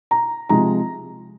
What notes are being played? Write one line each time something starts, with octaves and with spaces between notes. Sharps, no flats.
A#5
C3 F3 G#3 A#5